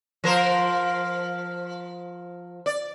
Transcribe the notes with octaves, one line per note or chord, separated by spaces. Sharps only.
F3 A#4 C5
D5